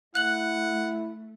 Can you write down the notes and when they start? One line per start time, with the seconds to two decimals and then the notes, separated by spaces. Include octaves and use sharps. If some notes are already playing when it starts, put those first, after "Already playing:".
0.15 A3 E4 F#5 F#6 F#7